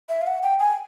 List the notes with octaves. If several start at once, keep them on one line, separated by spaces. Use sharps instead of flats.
E5
F5
F#5
G5
G#5